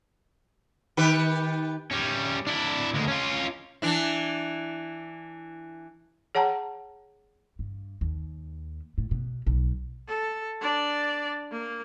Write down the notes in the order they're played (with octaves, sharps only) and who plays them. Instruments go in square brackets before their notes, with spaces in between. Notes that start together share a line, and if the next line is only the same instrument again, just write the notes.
[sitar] D#3 G4 B4
[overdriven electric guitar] G3 C#4
D4 E4
D2 G#3
C#4 F4
[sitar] E3 D4 E4
[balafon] G#4 C#5 F#5 A5 A#5
[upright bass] G2
D#2
A2
B2
B1
[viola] A4
D4 D5
A#3